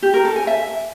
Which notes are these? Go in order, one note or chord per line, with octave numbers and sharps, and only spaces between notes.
G4
A#4
A4
G#5
E5